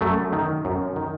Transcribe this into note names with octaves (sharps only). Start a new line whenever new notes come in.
F#2 F#3 A3
D#3
F#2
D#3